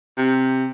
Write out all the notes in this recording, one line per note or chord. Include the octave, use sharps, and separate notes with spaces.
C3